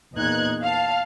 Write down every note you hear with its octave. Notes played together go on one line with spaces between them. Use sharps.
E2 A#2 D#4 F#6 G#6
F5 A5